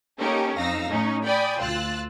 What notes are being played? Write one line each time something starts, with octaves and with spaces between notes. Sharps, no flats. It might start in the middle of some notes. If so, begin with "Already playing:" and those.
A#3 C#4 D#4 G4 A4 A#4
F2 D#4 F5 E6 A#6
A2 C#4 D#4
D5 G5 G#5 B5 D#6
D2 F4 E6 F#6 A6